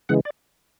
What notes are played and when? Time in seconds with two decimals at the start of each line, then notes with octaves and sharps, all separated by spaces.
0.09 C#3 E3 G#3 F#5
0.25 D5